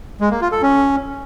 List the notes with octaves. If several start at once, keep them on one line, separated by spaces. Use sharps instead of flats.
G#3
A#3
F4
A4
C#4